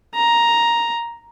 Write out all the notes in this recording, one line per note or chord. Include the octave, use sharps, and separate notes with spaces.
A#5